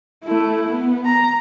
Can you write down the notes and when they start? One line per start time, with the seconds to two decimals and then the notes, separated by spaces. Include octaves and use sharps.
0.24 A3 E4
0.68 B3
1.05 A#5